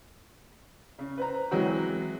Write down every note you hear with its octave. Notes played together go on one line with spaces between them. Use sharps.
C#3
B4 C5 A#5
E3 F#3 G#3 C4 F#4